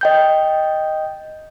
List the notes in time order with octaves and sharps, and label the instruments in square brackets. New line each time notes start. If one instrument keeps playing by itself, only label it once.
[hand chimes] D#5 G5 G6